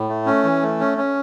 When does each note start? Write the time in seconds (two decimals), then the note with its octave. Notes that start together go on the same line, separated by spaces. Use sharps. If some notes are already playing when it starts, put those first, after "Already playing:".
Already playing: A2
0.09 A3
0.26 C#4
0.44 E3
0.63 A3
0.80 C#4
0.98 C#4